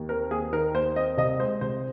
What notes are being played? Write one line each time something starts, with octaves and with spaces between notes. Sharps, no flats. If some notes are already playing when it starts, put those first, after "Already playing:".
Already playing: D#2
C4 A#4
D#2 G#4
D#3 A#4
D#2 C5
C4 D#5
C2 D#5
G#3 C5
C2 C5